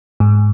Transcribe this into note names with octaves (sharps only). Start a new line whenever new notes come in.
G#2